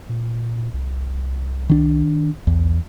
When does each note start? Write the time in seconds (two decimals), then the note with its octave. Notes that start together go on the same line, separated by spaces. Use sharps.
0.09 A#2
0.74 C2
1.70 D#3 D4
2.47 B1 E2